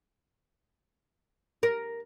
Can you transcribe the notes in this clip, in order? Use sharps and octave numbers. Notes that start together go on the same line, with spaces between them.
A#4